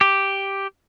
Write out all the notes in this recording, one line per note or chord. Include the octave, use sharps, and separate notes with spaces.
G4